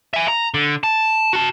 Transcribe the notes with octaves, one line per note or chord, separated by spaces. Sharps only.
E5 G#5
A#5
D3
A5
F#4 A5